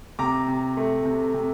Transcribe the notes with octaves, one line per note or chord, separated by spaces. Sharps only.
C3 A#5 D6
C3
A3
C3
C3